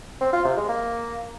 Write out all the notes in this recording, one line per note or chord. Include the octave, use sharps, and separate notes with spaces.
C4
F4
C3
G#3
A#3